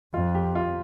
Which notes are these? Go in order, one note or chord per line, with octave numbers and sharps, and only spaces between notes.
F2 F4
G4
F4